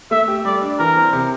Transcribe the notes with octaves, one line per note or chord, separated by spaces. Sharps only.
A3 E5
G4
G3 D5
D4
E3 A#4
C4
C3